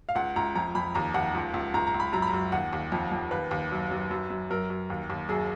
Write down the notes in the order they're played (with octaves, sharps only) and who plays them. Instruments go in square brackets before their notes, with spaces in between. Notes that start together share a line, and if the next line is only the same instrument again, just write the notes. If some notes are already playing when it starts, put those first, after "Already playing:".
[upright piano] F5
C#2 F#5
C#2 A#5
F2 A#5
F2 B5
D#2 A#5
D#2 F#5
C#2
C#2
C#2 A#5
A#5
C#2
B5
F#2 A#5
B5
A#5
F#2
D#2 F#5
D#2
F2
F2
D#2 B4
D#2
F#2
F#2
F#2
F#2
F#2 A#4
F#2
D#2
D#2
F#2 G#4